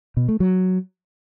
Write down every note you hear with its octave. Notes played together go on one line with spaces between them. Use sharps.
B2
A3
F#3